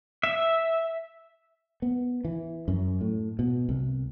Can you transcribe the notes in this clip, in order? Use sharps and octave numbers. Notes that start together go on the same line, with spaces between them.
E5
B3
E3
F#2
A2
B2
C2